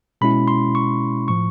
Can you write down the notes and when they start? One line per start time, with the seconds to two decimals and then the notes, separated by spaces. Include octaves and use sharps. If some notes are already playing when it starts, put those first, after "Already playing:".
0.21 B2 G#3 C#4 E4 B5
0.48 C6
0.75 C#6
1.28 A2 F3 C#6